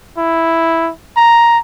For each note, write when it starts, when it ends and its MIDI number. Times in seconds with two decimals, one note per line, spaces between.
0.18 0.91 64
1.16 1.59 82